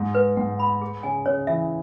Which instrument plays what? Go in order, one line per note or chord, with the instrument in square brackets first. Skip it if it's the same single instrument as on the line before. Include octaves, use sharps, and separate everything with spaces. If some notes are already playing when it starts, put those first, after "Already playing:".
Already playing: [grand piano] G#2
[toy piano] B4
[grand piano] G#2 [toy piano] F#5
[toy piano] B5
G#4
[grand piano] C#3 [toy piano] G#5
[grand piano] C#3 [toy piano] C#5
[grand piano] E3 [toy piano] E5